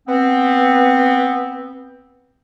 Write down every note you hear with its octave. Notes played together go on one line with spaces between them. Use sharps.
B3 C4